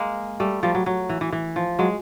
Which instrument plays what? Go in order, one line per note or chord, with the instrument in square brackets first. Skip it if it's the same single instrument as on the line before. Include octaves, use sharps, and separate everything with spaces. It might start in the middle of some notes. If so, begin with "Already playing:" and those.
Already playing: [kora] G#3 A#3
G3 A3
F3 G3
F#3
F#3
E3
E3
E3
F3
F#3 G#3